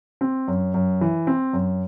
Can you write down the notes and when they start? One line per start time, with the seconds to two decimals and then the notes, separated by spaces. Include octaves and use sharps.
0.21 C4
0.48 F#2
0.74 F#2
1.01 E3
1.27 C4
1.53 F#2